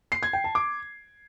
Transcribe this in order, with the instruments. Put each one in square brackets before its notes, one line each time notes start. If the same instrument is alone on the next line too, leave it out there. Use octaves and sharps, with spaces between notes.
[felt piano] C7
G#6
G5
A5
D6